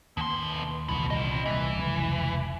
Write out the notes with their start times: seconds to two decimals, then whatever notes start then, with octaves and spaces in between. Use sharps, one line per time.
0.17 D#2 B2 C6
0.89 D#1 C2 B2 E3 B3
1.11 F4 D#5
1.46 C2 A#2 E3
1.75 F1 C#2 F#3